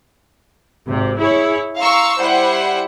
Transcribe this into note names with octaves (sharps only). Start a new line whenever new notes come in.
G#1 C3
E4 G#4 C#5
F5 A#5 C6 C#6 E6
G3 E4 C5 F#5